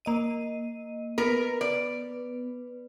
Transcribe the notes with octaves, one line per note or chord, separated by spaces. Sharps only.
A#3 D#5 D#7
B3 A#4 B4
D5